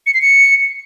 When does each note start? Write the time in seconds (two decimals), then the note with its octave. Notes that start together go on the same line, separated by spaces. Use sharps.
0.07 C#7
0.14 C7
0.22 C#7